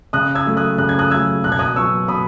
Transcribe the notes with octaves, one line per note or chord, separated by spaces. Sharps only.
C#3 D#6 F#6
E6 G#6
F#3 A3
D#6 F#6
C#3 F#6
G#6
D#6 F#6
F#3 A3 E6 G#6
B2 F#6
G#6
D#6 F#6
F#3 B3 C#6 E6
B2 B5 D#6